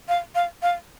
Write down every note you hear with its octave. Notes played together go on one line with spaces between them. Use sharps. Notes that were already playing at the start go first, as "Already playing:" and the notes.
F5
F5
F5